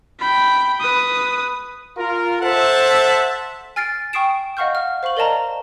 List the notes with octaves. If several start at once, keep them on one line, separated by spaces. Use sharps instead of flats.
G5 B5
B4 D#6
F4 A#4
A4 C5 E5 F#5 A5
G#5 F6 A6 C7 D7
G5 C#6 D#6 C7 D7 E7
D#5 F5 F#5 C#6 F6 G6
F6
C5 F5 C#6 F#7
A#4 D5 D#5 A5 A#5